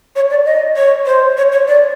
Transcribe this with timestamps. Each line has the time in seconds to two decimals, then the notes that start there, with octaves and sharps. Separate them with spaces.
0.16 C#5
0.30 D5
0.45 D#5
0.76 C#5
1.06 C5
1.37 C#5
1.52 C#5
1.68 D5